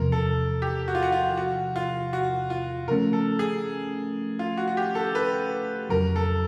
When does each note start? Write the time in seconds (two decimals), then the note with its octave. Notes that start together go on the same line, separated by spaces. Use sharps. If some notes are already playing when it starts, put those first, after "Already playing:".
Already playing: E2 C3 F3 A#4
0.12 A4
0.62 G4
0.88 F#4
0.95 F4
1.03 F#4
1.12 F4
1.37 F#4
1.76 F4
2.13 F#4
2.50 F4
2.88 C#3 F3 A3 C#4 A#4
3.13 A4
3.39 G#4
4.39 F4
4.57 F#4
4.68 F#4
4.77 G4
4.95 A4
5.15 B4
5.90 F2 C#3 F#3 A#4
6.16 A4